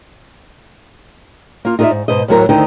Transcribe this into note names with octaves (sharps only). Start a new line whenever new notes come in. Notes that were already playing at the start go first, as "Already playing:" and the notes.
A#3 F4
D#4 F4 A#4 C#5 D5 E5
G#2
G#2 B2 C5 D#5
D#2 A2 F#3 C4 A#4
D2 D3 D#3 D#4 C5 G5